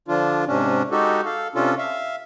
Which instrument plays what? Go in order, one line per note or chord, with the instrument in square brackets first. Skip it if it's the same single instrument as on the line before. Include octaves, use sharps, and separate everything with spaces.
[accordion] D3 F3 D4 F4
G#2 C3 C#4 D4
G#3 D#4 F#4 G4 A4
A4 F5
C3 C#4 D4 F4 A4
E5 F5